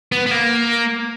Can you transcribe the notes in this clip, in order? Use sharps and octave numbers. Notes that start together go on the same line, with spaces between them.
B3
B3
A#3